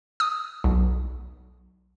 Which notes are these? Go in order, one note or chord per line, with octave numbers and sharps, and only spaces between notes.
D#6
B1